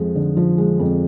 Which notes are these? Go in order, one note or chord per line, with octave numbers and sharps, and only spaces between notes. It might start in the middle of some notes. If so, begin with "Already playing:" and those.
Already playing: F2 F3 G#3
D3
F3
G#3
F2